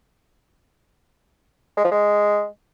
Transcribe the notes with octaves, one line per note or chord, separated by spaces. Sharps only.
G#3
F3
G#3